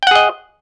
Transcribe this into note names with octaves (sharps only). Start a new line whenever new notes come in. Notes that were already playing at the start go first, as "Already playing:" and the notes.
G#4 D#5 F#5 G5